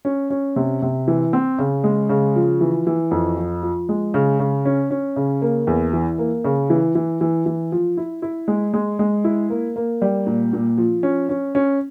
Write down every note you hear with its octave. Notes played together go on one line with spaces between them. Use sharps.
C#4
C#4
C3
C3
E3
C4
C#3
G#3
C#3
F3
E3
E3
F2
F3
F3
G#3
C#3
C#3
C#4
C#4
C#3
A#3
E2
E3
A#3
C#3
E3
E3
E3
E3
F3
E4
E4
G#3
G#3
G#3
E4
A#3
A#3
G3
A#2
A#2
F3
C#4
C#4
C#4